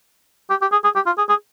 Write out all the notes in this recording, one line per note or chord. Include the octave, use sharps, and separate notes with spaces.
G4
G4
G#4
G#4
G4
F4
G#4
G#4